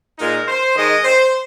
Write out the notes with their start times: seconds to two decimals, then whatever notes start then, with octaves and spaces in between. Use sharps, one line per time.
0.19 A#2 G#3 D#4 A#4
0.48 C5
0.76 D#3 G#3 D#4 D#5
1.04 C5